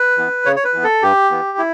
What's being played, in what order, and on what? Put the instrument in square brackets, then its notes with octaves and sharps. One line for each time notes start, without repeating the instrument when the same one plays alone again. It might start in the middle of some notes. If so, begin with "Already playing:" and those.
Already playing: [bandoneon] B4
E3 B3
C#3 C#5
C#5
B4
E3 B3
A4
G2 G4
E3 B3
E4